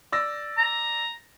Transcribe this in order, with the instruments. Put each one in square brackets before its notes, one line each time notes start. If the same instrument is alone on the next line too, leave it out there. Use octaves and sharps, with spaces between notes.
[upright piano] D5 E6 A#6
[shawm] A#5